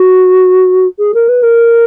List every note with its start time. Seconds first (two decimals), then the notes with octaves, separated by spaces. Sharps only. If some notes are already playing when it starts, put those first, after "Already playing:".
Already playing: F#4
0.99 G#4
1.14 A#4
1.29 B4
1.43 A#4